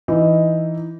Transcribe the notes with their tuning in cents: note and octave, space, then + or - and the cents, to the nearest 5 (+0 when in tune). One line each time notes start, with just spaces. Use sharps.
E3 +0 D#4 +0